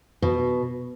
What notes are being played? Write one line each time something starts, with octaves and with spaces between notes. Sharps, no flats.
B2